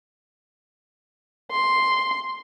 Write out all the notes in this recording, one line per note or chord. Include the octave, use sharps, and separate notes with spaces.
C6